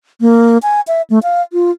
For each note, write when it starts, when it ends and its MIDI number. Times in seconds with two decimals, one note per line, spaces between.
0.21 0.58 58
0.63 0.81 80
0.88 1.02 76
1.10 1.19 57
1.23 1.42 77
1.53 1.71 65